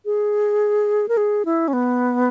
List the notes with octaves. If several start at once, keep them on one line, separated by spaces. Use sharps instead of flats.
G#4
A#4
G#4
E4
C#4
B3